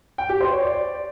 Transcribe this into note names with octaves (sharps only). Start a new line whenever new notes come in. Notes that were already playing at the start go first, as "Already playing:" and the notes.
G5
G4
C5
C#5
D5